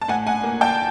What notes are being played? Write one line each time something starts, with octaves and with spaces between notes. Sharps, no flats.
A5
A2 F#5 G#5
F#5 G#5
A#3
G5 A5